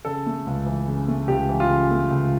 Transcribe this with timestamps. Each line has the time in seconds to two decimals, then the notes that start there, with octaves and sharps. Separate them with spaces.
0.05 C#3 A4
0.26 A3
0.46 C#2
0.66 E3
0.88 C#3
1.08 A3
1.28 C#2 G4
1.49 E3
1.60 F4
1.69 C#3
1.91 A3
2.10 C#2